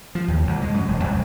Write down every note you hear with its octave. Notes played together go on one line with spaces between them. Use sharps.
F3
D#2
C2
G#3
F#2
E1
C2